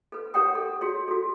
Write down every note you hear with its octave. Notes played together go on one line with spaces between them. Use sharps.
A4 B4
G4 A#4 C#5 F#5 G5 D#6
A4
F#4 G#4 C#5
F#4 A4